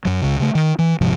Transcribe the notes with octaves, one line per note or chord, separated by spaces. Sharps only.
F#2 F#3
C#2 C#3
C#3 A3
D#3
E3
D#1 G#2 C3 F3